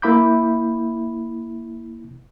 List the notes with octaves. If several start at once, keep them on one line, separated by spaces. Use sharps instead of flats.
A#3 E4 E5 B5 D6 G6